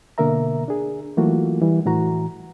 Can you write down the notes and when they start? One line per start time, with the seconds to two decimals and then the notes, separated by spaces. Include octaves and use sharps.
0.18 B2 D3 A#3 A#4 E5 A#5
0.68 D4 G#4
1.17 E3 F#3 A3 A#3 F4 F#4
1.62 E3 G3
1.86 A2 E3 F#4 A#5